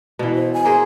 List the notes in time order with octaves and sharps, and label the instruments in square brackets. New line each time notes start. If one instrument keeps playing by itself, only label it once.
[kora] B2 E3
[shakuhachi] C5
G#5
[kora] A#3 G#4 C5